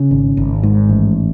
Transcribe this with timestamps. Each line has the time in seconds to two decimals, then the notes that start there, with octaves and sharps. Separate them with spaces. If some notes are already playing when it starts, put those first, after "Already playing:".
Already playing: C#3
0.11 G#1
0.37 G#1
0.63 G#2
0.89 A1